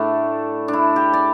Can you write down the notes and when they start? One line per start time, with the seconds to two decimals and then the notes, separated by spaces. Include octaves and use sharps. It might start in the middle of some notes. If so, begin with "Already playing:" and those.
Already playing: A2 A3 D4
0.68 D4
0.73 E4
0.96 G4
1.13 D5